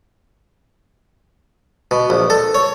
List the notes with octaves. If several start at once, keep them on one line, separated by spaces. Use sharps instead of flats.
B2
A#1
A4
C#5